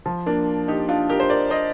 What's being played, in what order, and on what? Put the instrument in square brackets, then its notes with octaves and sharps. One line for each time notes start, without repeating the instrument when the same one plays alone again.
[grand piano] F3
A#3 D4
D#4 G4
D4 F4
G4 A#4
C5
A#4 D5
C5 D#5